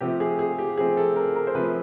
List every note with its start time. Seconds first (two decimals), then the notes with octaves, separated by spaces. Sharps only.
0.01 C3 F3 A3 C4 G4
0.20 G#4
0.39 G#4
0.58 G4
0.78 C3 F3 A3 C4 G#4
0.97 A4
1.16 A#4
1.36 A#4
1.47 C5
1.55 C3 F3 A3 C4 B4